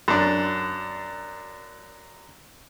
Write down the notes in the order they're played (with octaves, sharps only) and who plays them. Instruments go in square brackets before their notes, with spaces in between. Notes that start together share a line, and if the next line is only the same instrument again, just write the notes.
[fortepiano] F#2 D4